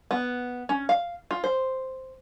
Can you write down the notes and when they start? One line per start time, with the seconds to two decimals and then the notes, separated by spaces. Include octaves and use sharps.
0.11 B3
0.69 C#4
0.89 F5
1.31 F4
1.44 C5